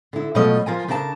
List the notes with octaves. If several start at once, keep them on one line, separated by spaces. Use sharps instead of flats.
D3 E4
B2 F3 F#3 A3 C#5 D#5
F3 F4 A#4 G#5
C#3 D4 A#4 F5 A5